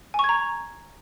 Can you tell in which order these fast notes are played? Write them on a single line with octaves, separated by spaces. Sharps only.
G#5 C#6 G#6 A#5